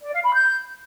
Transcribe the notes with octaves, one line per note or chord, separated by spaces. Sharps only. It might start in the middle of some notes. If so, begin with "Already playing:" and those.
D5
F5
B5
G6